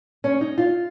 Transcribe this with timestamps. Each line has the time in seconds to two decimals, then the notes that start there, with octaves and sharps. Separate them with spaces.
0.24 C#4
0.41 D#4
0.58 F4